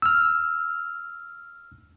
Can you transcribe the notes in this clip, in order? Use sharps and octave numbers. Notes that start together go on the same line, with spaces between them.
E6 F6